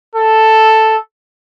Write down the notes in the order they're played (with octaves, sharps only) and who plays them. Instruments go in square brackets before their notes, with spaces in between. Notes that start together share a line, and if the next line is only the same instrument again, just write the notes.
[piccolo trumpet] A4